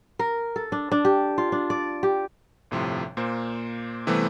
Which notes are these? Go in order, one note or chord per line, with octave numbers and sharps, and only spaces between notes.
A#4
A4
D4
D4
G4
F4
D4
D5
G4
G1 A2 C3 F3 C6
A#2 A#3 C5
C3 E3 G3 A3 B3 C4